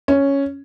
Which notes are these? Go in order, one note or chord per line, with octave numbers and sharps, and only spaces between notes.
C#4